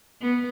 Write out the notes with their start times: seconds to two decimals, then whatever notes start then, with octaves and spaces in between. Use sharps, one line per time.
0.22 B3